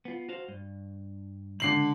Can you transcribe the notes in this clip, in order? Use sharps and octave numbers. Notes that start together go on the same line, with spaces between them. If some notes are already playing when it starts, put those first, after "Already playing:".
B3 F4
F#4 C5 F5
G2
C#2 D3 C7 F#7